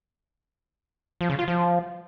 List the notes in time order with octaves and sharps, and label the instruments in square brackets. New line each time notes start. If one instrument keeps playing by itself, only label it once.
[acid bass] F3
C#3
F4
F3